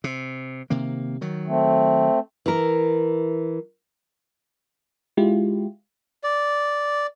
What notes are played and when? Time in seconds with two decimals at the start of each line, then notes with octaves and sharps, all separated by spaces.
0.04 C3
0.70 C3 D#3 A#3
1.21 D#3 F#3
1.47 A3 C4
2.46 E3 A#4
5.17 G#3 E4 F4 G4
6.23 D5